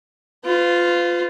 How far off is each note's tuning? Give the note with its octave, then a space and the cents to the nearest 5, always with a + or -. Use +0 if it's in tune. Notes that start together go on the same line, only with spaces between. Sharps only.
F4 +0 B4 +45